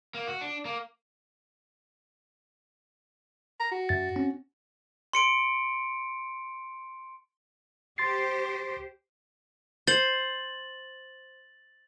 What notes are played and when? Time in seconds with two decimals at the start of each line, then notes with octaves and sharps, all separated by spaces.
0.15 A#3
0.28 F#4
0.41 D4
0.65 A#3
3.60 A#5
3.72 F#4
3.89 F#2 A6
4.16 C4 C#4
5.13 C6 C#7 D7
7.98 G4 C5 C6 A6 C7
9.87 C5 A6 F#7